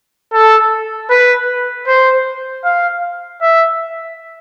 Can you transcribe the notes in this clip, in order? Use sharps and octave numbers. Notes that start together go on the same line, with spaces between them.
A4
B4
C5
F5
E5